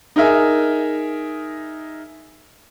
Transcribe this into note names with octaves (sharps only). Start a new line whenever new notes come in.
D#4 G#4 A#4 E5 G#5